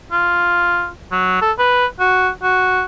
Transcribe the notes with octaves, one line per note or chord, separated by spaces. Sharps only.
F4
F#3
A4
B4
F#4
F#4